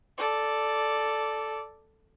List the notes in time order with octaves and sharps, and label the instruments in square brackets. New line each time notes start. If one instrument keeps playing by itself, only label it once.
[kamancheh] A4 D5